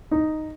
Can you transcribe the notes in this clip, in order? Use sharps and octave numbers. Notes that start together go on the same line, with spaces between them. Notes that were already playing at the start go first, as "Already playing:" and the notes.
D#4